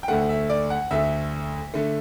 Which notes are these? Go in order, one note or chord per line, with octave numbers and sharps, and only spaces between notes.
G5
D2 D3 A3 F#5
E5
D5
F#5
D2 D3 A3 E5
D3 A3